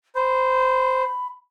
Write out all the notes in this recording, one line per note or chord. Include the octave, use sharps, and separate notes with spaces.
C5 B5